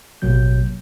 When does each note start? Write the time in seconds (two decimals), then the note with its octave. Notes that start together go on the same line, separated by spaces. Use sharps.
0.22 A1 B2 F#3 A#3 G6